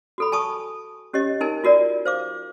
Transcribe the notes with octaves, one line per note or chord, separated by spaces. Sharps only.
F#4 A4 B5
G#5 A5 C#6 D#6
C#4 G4 C#5 D#5
D#4 A#4 G#5
F4 F#4 A#4 D5
C5 F5 D6